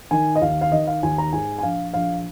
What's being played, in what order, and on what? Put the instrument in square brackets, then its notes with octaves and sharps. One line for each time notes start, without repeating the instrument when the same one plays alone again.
[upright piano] D#3 G#5
D#5
D#2 F5
F5
D#3 D#5
F5
D#2 G#5
A#5
G#2 G#5
G#5
A#1 F5
A#1 F5